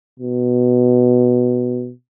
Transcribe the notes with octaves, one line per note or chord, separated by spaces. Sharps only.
B2